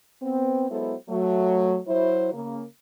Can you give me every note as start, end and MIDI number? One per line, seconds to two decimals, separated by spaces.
0.23 0.66 59
0.23 0.66 60
0.70 0.95 54
0.70 0.95 56
0.70 0.95 59
0.70 0.95 64
0.70 0.95 69
0.70 0.95 72
1.09 1.78 54
1.09 1.78 57
1.88 2.31 54
1.88 2.31 64
1.88 2.31 72
2.33 2.63 49
2.33 2.63 58